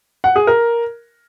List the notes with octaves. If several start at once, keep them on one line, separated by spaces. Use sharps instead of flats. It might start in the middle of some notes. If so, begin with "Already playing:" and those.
F#5
G#4
A#4